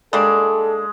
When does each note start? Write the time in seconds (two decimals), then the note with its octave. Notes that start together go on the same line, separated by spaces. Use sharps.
0.13 G3 G#3 A#3 D4 A4